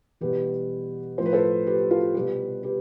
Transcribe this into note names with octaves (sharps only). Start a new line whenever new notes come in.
E2 B2 G3 G4 B4
A2 F3 C5
B4
A4 C5
G4 B4
F4 A4
C2 B2 G3 G4 B4
G4 B4